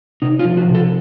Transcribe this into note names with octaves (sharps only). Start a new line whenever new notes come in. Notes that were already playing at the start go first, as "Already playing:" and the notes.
C3 D#4
F4
F3
F#4
C3
A4